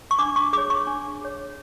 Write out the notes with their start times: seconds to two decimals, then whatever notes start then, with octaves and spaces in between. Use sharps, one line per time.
0.11 C#6
0.19 D4 D6
0.36 C#6
0.53 G#4 C#5 D6
0.70 C#6
0.87 D4
1.21 G#4 C#5